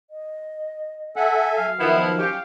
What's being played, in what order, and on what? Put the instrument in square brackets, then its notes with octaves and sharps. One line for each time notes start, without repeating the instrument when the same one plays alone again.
[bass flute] D#5
[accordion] A4 E5 G#5 [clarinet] F#5
[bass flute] F#3 [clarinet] F5
[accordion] D#3 F3 [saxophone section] B3 E4
[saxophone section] C#4 F4 G4